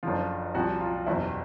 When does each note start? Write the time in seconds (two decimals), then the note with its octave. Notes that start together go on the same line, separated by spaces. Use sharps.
0.03 F#1 F#2 D3 F3 F4
0.54 C2 A#2 F3 F#4
0.81 F4
1.07 F#1 E2 B2 E4